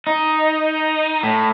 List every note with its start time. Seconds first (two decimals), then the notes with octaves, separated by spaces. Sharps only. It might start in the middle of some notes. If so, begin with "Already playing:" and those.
0.07 D#4
1.23 A2